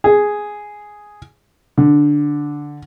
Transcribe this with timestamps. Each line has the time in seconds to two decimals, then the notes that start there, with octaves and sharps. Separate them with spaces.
0.04 G#4
1.78 D3